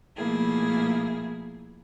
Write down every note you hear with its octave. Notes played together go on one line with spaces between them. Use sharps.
B2 F3 A3 A#3 E4 G#4